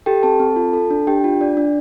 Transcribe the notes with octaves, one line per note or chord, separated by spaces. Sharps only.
G4 A4 G5
C4 A4 A5
C4
F4
A4
D4
D4 G4 G5
F4
D4 D5
D4